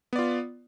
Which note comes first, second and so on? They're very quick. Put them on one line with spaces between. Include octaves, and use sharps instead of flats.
B3 D5 F4